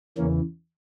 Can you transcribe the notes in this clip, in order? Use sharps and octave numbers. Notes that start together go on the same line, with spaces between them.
E2 C#3 E3 A#3 C#4